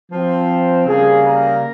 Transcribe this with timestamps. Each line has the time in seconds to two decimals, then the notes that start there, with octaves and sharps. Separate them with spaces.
0.11 F3 C4
0.86 C#3 G3 A#3 G#4
1.24 A#4